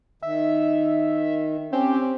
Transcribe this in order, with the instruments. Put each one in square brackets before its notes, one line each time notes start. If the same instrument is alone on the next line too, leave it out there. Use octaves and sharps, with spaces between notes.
[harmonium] D#3 [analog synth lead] E5
[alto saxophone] C4 [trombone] C#4 [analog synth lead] G4